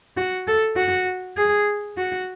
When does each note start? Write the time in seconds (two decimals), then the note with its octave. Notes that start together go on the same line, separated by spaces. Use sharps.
0.17 F#4
0.48 A4
0.77 F#4
1.37 G#4
1.98 F#4